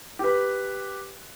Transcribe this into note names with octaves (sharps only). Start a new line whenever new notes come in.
G4 B4